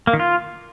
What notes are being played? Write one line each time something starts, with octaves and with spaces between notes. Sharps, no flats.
A#3
D#3
F4